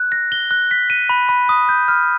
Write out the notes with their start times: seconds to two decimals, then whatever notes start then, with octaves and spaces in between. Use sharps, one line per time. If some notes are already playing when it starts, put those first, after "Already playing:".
Already playing: F#6
0.12 A#6
0.32 G7
0.51 F#6
0.71 B6
0.90 D#7
1.09 B5
1.29 B5
1.49 D#6
1.69 G6
1.88 F6